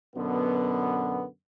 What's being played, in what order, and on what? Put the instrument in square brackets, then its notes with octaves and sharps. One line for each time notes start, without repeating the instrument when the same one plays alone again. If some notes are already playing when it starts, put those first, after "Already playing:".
[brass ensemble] F#2 B2 D3 B3